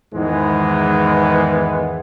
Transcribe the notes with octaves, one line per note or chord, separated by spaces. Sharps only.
E2 G#2 D#3 E3 G#3 B3